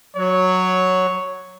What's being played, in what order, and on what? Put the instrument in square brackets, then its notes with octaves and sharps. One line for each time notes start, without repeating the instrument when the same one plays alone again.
[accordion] F#3 [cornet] C#5